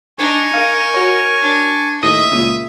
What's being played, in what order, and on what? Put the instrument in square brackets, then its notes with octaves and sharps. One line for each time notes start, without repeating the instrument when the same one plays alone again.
[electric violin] D4 [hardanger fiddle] D#4 [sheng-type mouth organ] G#5 C#6
[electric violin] A#4 [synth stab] F5
[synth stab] F#4 C#5
[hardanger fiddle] D4
[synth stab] D#2 A2 D#5 [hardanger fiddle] E5 [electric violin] D#6
[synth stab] C#2 A#2 C#3